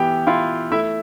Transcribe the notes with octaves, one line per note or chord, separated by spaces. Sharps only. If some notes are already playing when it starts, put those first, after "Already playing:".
Already playing: E3 B3 E4 G4 G5
E4 F4 F5
A3 E4 E5